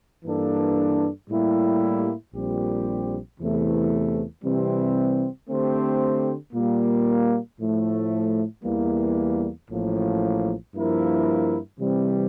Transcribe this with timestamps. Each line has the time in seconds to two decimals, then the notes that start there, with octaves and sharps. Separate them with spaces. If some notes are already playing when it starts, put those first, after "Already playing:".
0.24 G2 E3 A#3 D4 A4
1.29 A2 G3 A#3 E4 G4
2.33 A#1 A#2 G3 C4 G4
3.39 E2 C3 E3 A3
4.43 C3 E3 G3 C4
5.49 D3 A3 C4 G4 C5
6.53 A#2 G3 A#3
7.59 A2 F3 A3
8.63 E2 E3 G3 A#3
9.69 A1 A2 F3 A#3
10.74 G2 F3 A#3 E4 A#4
11.79 C3 E3 G3 C4